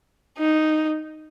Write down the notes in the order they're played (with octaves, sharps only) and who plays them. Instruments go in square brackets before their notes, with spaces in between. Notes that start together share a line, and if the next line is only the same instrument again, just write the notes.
[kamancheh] D#4